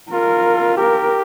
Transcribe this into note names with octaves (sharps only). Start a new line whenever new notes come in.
F4 A#4
G4 A#4